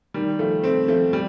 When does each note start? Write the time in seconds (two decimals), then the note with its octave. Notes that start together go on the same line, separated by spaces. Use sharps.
0.14 D#3 G3
0.39 F3 A3
0.63 A3 C4
0.88 F3 A3
1.13 G3